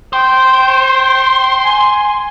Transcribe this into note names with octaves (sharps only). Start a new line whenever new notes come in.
C5 G5
G#5